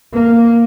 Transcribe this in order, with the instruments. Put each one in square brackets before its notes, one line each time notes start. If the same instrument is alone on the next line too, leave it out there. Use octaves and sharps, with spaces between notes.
[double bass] A#3